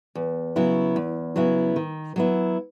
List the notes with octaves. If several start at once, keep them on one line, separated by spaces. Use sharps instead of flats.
E2
C#3 F#3 B3 E4
E2
C#3 F#3 B3 E4
D#3
F#3 B3 E4